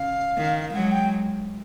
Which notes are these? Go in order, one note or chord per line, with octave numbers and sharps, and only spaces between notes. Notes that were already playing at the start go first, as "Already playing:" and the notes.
Already playing: C#3 F5
D#3
F#3 G#3 F#5
G5